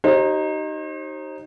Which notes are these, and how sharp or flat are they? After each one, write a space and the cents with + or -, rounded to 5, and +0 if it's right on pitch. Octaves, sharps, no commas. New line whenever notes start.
D#4 -5 G4 -35 C5 +40